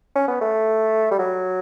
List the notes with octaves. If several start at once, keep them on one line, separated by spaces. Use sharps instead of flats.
C#4
B3
A3
G3
F#3